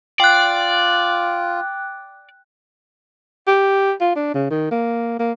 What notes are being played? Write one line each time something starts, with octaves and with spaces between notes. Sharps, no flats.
F4 D5 G5 F#6
G4
F4
D4
C#3
D#3
A#3
A#3